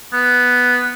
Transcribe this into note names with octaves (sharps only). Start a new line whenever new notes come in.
B3